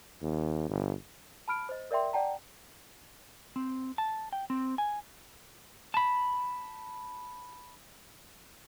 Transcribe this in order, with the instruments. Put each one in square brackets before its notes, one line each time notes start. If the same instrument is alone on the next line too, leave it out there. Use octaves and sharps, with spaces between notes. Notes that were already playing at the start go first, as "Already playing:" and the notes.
[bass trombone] D#2
G1
[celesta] A5 B5 F6 D7
C5 D#5
A#4 D5 E5 G5 C6
D5 F#5 G5 A5 A#5
[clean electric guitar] C4
A5
G5
C4
G#5
[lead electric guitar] A5 B5